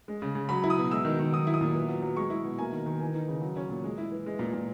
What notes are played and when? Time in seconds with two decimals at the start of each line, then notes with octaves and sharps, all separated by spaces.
0.08 G#3
0.22 C#3
0.35 C#3
0.49 F#3 B5
0.64 E4
0.70 D#6
0.78 B2
0.91 G#3 E6
1.05 D#3
1.19 D#3
1.32 F#3 D#6
1.47 E4
1.54 D#6
1.61 A#2
1.75 B3
1.88 F#3
2.02 F#3
2.16 G#3 C#6
2.30 E4
2.44 B2
2.59 A#3 G#5
2.72 D#3
2.86 D#3
3.00 E3 G#5
3.15 D#4
3.28 C#3
3.41 F#3
3.57 C#4
3.69 A#2
3.84 G#3
3.98 E4
4.12 E3
4.26 G#3
4.39 A#2
4.53 A#2